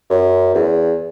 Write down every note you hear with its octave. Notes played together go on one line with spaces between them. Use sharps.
F#2
E2